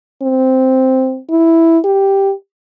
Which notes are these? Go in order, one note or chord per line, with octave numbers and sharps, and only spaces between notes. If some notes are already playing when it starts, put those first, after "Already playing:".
C4
E4
G4